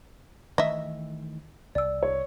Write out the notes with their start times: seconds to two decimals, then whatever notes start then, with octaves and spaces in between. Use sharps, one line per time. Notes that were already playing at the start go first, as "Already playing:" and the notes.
0.58 D#3 E3 A3 D#5 E5
1.75 C2 D5 E6
2.03 C#5